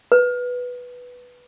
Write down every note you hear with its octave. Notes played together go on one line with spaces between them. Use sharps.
B4